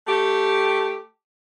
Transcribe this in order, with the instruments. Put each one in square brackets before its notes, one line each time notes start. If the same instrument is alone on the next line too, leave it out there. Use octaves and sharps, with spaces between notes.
[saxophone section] A3 G4